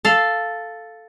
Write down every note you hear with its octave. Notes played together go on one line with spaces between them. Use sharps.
A4 F5